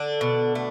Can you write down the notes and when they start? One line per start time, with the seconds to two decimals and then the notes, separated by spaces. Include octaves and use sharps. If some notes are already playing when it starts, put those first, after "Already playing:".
Already playing: D3 D4
0.21 B2
0.55 A3